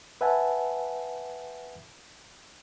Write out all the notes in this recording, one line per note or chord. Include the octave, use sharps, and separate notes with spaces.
B4 E5 F#5 G#5 A5